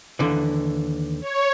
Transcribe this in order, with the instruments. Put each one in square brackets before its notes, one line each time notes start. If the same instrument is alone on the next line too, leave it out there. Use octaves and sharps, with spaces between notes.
[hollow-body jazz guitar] D#2 D3 E3
[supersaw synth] C#5